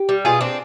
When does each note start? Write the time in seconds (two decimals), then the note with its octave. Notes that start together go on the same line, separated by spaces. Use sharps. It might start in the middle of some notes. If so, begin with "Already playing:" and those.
Already playing: G4
0.09 G3
0.25 B2 F4 G#4
0.41 C4 D4